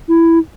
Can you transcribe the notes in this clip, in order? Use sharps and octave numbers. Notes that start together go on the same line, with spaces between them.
E4